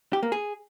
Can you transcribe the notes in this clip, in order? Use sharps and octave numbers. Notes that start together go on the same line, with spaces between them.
G4
A#3
G#4